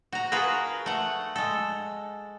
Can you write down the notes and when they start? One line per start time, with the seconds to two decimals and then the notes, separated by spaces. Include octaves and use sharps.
0.12 F#4 A#5
0.32 F4 F#4 G#4 A#4 B4
0.86 A3 F#5
1.36 G#3 A4